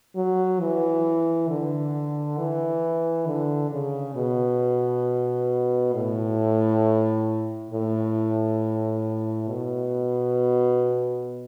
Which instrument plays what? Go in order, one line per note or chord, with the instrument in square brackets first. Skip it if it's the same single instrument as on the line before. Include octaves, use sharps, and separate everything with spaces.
[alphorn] F#3
E3
D3
E3
D3
C#3
B2
A2
A2
B2